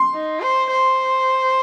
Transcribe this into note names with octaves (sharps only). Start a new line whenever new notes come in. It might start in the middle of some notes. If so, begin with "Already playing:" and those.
Already playing: C6
D#4
C5
C5